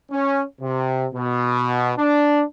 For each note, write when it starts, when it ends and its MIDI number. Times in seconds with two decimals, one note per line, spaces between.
0.11 0.42 61
0.61 1.06 48
1.15 1.92 47
1.98 2.43 62